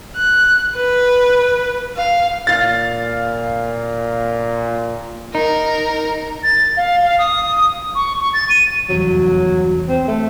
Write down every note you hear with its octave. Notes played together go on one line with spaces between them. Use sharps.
F#6
B4
F5
A#2 F5 A6
D#4 A#4
A6
F5
F5
D#6
C#6
C#6
A6
D#7
F1 E2 G2 F#3
C4
A3